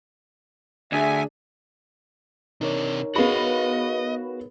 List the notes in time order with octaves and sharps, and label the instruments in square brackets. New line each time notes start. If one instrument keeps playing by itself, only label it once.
[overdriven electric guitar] D2 [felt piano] D4 G#4 [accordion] E5 G#5
[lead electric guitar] C3 D4 [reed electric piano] D#4 A#4 C#5
[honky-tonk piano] B3 G#4 B5 [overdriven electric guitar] F#4 F5 [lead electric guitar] D#5